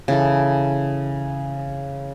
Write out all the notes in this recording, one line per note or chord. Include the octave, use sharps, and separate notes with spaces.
C#3 E3 A4